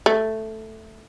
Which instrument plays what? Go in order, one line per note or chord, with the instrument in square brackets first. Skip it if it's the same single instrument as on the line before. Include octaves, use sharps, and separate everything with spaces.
[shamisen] A3